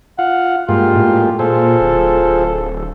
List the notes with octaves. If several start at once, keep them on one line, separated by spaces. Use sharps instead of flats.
F4 F5 F#5
G2 G#3 A#3 F4 G4
A2
A#2 F4 G#4 A4 C5
D1